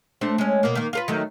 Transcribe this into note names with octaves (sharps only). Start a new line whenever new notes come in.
A3 C4 D4
G#3 C#4
B2 A#3
D#3 A#3
F4 A#4 B4
D#3 F#3 A3